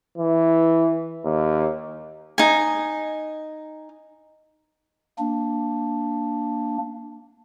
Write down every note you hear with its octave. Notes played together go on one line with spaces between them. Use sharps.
E3
D#2
D#4 G#5
A#3 D4